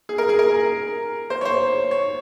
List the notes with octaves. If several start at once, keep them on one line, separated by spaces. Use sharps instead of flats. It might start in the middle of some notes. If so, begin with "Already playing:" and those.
G#4
A#4
G#4
A#4
C5
C#5
C5
C#5